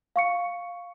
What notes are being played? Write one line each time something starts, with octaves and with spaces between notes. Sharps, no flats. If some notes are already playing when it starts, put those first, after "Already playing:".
F5 C#6 C#7